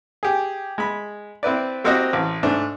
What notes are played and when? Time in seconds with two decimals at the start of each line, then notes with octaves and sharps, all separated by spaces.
0.23 G4 G#4
0.78 G#3 B5
1.43 C4 E4 B4 D5
1.84 A#3 C4 E4 F#4 G4 D#5
2.13 A1
2.43 G#2 A3 D4